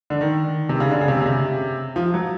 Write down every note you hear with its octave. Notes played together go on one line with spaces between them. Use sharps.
D3
D#3
C3
C#3
D3
C#3
C3
C#3
C3
F3
F#3